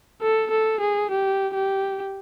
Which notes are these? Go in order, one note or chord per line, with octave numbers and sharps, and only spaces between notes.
A4
A4
G#4
G4
G4